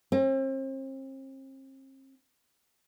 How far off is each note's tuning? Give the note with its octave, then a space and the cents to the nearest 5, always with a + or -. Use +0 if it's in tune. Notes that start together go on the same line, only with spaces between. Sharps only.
C4 +40